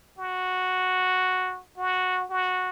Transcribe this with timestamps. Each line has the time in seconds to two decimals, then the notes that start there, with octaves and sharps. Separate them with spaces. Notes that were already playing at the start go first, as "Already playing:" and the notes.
0.18 F#4
1.77 F#4
2.30 F#4